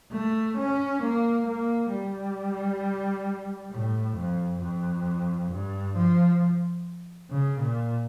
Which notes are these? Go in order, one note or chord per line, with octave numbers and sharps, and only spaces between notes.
A3
C#4
A#3
A#3
G3
A2
F2
F2
G2
F3
C#3
A#2